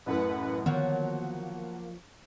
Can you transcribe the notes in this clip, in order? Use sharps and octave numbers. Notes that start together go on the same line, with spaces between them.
A1 F#2 A2 B4 F#5
D3 D#3 F3 F#3 A#3 B3 F#5